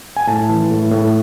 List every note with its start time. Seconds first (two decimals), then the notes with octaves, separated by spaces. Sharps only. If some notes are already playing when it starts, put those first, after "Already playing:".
0.16 G#5
0.27 A2 A5
0.49 E3
0.71 A2
0.91 A2